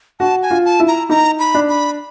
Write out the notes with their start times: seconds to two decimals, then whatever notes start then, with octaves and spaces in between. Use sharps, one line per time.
0.20 F#4 A5
0.43 G#5
0.50 F4
0.65 A5
0.80 E4
0.88 A#5
1.10 D#4 A#5
1.39 B5
1.54 D4
1.70 B5